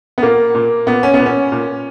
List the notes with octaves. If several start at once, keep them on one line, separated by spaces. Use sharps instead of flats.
B3
A#2 A#3
A#2
A#2 B3
C#4
B3
A#2
C#4
A#2